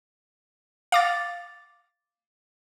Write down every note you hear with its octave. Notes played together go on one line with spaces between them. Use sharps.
F5 D6 A6